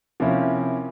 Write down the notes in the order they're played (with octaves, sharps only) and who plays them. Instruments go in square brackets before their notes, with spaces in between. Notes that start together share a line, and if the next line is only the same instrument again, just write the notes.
[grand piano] C3 F3 A#3 C#4 E4